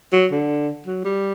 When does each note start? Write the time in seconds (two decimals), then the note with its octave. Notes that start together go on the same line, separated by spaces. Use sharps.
0.13 F#3
0.31 D3
0.87 F#3
1.05 G3